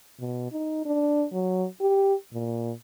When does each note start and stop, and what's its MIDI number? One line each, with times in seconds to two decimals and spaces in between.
0.20 0.47 47
0.52 0.82 63
0.85 1.25 62
1.33 1.65 54
1.81 2.14 67
2.33 2.72 46